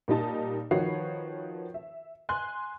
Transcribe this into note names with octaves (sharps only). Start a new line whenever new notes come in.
A#2 G3 D#4 A5
D#3 F3 F#4 B4 C#5 C7
E5
G#5 C6 F#6